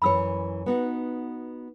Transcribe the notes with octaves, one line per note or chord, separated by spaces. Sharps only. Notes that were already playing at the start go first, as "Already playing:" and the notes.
F#2 E3 C#5 B5 E6
B3 D#4 F#4